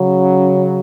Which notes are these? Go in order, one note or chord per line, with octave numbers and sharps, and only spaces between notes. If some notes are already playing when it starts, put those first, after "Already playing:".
Already playing: C#3 F#3